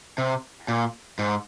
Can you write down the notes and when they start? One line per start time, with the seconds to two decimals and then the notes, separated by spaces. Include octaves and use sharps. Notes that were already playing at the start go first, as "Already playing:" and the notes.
0.18 C3
0.68 A#2
1.19 G#2